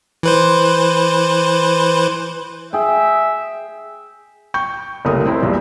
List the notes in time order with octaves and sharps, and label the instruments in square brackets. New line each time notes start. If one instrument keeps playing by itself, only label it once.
[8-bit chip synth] E3 B4 C5
[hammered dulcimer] G#4 G5 [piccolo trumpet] E5
[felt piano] G5 C#6 G6
F#1 C2 A3 A#4 D#6
C4 E4 A#4
B1 E2 G2 A#2